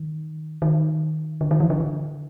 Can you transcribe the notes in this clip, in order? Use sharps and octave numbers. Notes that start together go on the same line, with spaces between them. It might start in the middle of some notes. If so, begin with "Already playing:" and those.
Already playing: D#3
D#3
D3
D#3
E3
D3
D3